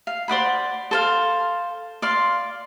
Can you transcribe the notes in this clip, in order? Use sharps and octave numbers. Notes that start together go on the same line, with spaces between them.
F5
C5 D5 F#5 B5
A4 C5 F5
D5 F5 C6